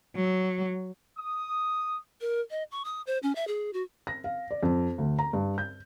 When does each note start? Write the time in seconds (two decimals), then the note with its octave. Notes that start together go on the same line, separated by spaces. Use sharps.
0.15 F#3
1.18 D#6
2.21 A#4
2.50 D#5
2.71 C#6
2.85 D#6
3.07 C5
3.23 C#4
3.35 E5
3.48 G#4
3.73 F#4
4.07 A#6
4.24 F5
4.51 D5
4.63 F2
4.98 D2
5.19 A#5
5.33 G2
5.58 G6